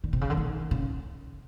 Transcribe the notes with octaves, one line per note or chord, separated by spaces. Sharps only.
D3
C3
C#3
D3
D#3
C#3